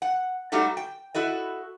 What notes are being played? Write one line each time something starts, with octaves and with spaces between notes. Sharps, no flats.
F#5
G3 A3 D#4 F#4 G4 A4
G5
E4 F#4 A4 D#5